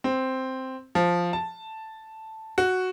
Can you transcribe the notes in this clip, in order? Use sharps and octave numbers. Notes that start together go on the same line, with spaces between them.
C4
F3
A5
F#4